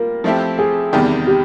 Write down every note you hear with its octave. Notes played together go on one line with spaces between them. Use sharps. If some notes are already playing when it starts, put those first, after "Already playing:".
Already playing: G3 A#3 F4 A#4
F3 A3 C4 E4 G4
G#4
E2 C3 D#3 G3
G4